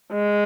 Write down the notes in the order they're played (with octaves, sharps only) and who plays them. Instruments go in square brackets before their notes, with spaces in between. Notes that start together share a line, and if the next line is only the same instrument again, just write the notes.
[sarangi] G#3